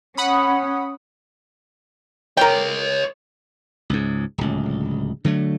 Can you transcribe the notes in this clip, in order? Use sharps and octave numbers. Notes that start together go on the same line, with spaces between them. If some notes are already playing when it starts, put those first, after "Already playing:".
C#4 F#5 B5 D#6
A#4 C#5 D#5 G5
C#2 G#2
D1 C#2
D3 F#3 G#3 A3